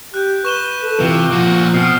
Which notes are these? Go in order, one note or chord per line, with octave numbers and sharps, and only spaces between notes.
G4 F#6 G6
B4 C#6 E7 G7
A4
C3 E3 F4
A#2 F3 F#4
B2 C4 F6 C7